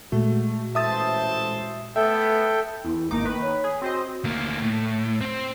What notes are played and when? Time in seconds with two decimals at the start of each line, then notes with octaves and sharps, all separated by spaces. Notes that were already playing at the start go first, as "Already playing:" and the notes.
0.12 A#2 G#3 A3 F#4
0.75 A1 C5 E5 A5 D#6 A6
1.96 A3 B3 A4 E5 G5
2.85 E2 E4
3.11 G#1 A#3 D#4 D6
3.25 D#3 B4
3.42 C#5
3.64 G#4
3.82 C4 F#4 C5 D#5
4.24 D2 A#3
4.62 A2
5.21 C4 C5